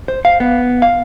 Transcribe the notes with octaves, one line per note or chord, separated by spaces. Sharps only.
C5
F5
B3
F5